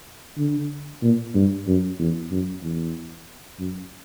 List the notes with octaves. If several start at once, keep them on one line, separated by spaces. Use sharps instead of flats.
D3
A#2
G2
F#2
E2
F#2
E2
F#2